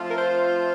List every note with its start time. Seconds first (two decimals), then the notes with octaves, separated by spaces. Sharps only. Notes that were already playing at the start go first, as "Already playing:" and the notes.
Already playing: F3 A3 C4 F4
0.10 A#4
0.18 C5